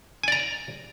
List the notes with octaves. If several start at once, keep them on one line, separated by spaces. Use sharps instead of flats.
D5 G#5 A#5